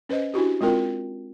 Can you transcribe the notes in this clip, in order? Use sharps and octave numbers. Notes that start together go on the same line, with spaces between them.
C#4 B4 C5 D#5
D4 E4 F#4 G4
G#3 C4 F4 A#4 G5